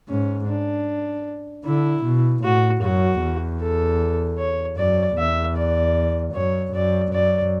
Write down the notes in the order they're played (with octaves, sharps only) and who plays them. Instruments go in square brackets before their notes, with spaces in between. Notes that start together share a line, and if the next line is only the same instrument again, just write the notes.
[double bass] G#2 [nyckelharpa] C#4
[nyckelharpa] D4
[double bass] D3 [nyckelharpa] E4
[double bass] B2
[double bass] A2 [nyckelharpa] F#4
[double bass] F#2 [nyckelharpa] F#4
[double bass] E2
[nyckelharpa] A4
C#5
[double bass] F#2 [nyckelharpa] D5
[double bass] E2 [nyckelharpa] E5
[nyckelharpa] D5
[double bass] F#2 [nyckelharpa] C#5
[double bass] F#2 [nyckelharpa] D5
[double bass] F#2 [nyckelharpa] D5